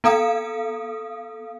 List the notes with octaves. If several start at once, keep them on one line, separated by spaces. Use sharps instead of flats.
B3 A4 F5 D#6